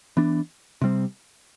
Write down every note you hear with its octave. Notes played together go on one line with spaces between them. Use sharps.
E3 B3 D4
C3 G3 C4